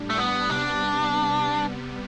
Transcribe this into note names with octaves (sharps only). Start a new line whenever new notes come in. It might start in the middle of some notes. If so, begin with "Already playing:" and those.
Already playing: A2 G3 D4
A3
B3
C3 G3 B3 D4